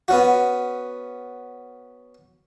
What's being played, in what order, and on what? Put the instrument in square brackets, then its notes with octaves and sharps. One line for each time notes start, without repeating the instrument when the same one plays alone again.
[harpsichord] B3 C#4 F#4